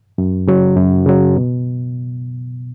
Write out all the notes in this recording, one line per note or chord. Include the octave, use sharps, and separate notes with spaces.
F#2
C#3 F#3
F#2
C#3 F#3
B2